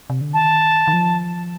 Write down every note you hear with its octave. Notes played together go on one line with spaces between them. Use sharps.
C3
D3
D#3 A5
D#3
F3